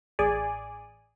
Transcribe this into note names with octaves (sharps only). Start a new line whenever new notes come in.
A1 G#4 D5 G#5